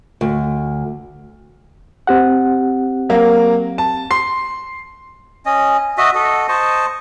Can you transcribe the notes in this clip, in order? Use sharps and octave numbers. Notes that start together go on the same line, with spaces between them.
D2
C4 G4 F#5
F#3 A#3
A5
C6 C7
C#4 D#5
F#4 D#5 E5
F#4 A4 D#5
C5 D#5 A5 C#6